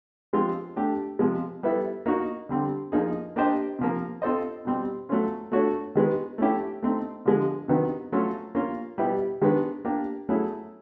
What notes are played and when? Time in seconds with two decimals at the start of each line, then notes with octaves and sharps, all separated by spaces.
0.33 F3 G#3 C4 F4
0.76 A3 D4 G4
1.19 C3 F3 G#3
1.63 G3 B3 E4 A4
2.06 A#3 D#4 F#4
2.49 D3 G3 C4
2.92 F3 A#3 D#4 G#4
3.36 A#3 D4 G4 C5 D#5
3.79 C3 F3 A#3
4.22 C4 F4 A4 C5 D#5
4.65 B2 G3 C4
5.09 F#3 A3 C#4 F4
5.52 A3 D4 F#4 A4 C#5
5.95 D#3 G#3 B3
6.38 A3 C#4 E4 G4
6.83 A3 C4 D#4
7.25 D3 F3 G#3
7.68 C3 D#3 F#3 B3
8.12 F#3 A3 C#4 F4 A4
8.55 A#3 C#4 F4
8.98 B2 G3 B3 E4 G4
9.41 D#3 G#3 B3 D4
9.85 A#3 D4 G4
10.29 F#3 A3 C#4 E4 G#4